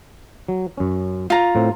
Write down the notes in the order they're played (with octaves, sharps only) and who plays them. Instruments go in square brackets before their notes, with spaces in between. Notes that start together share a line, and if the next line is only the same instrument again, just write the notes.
[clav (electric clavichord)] F#3
F#2 C#4
[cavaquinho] F4 A#5
[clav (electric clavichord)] A2 C4